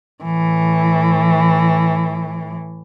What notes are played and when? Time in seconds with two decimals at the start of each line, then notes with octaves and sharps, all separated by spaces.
0.24 A2 E3